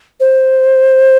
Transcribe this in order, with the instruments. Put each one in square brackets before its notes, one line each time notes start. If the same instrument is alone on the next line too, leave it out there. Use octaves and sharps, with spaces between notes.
[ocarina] C5